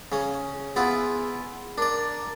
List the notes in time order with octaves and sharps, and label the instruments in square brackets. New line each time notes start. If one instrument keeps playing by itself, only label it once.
[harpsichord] C#3 C#4
[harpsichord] B3 E4 F4 [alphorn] G#4
[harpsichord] D4 D5 [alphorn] A#4